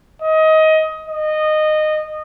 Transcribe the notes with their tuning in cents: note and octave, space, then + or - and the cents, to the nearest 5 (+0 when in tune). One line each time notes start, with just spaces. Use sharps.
D#5 +20
D#5 -15